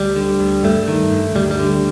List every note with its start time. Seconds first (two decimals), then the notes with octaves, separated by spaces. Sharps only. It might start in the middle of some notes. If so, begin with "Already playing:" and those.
Already playing: D2 G3
0.16 D3
0.40 D2
0.64 G2 A3
0.88 D#3
1.12 G2
1.35 D2 G3
1.51 G3
1.59 D3